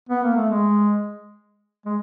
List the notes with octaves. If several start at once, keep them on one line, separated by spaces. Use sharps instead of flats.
B3
A#3
A3
G#3
G#3